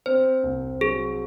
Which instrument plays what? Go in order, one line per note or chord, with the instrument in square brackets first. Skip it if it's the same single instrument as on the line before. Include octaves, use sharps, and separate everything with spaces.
[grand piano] C4 [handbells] C5
[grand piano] C2
[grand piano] F#3 [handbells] G#4